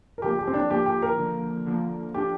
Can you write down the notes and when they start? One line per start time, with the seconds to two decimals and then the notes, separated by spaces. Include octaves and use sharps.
0.18 A#4
0.22 D3 F3 A#3 G4
0.39 G4
0.47 C4
0.54 D4
0.70 D3 F3 A#3 G4
0.86 G4
1.02 A#4
1.18 D3 F3 A#3
1.66 D3 F3 A#3
2.14 D3 F3 D4 G4